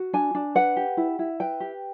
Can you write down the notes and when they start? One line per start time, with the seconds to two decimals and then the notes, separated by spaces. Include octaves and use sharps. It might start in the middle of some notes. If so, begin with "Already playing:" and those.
Already playing: F#4
0.13 D4 G#5
0.35 D4
0.55 B4 F#5
0.76 G4
0.97 E4
1.19 E4
1.40 B4 G5
1.60 G4